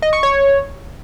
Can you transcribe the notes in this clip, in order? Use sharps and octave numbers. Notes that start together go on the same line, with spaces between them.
D#5
C#6
C#5